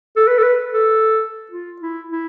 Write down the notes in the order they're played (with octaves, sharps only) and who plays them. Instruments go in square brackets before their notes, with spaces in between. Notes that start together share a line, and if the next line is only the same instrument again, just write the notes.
[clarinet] A4
B4
A4
B4
A4
F4
E4
E4